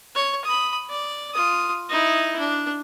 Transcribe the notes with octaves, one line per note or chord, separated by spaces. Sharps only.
C#5
B5 D#6
D5
F4 D#6
D#4 E4
D4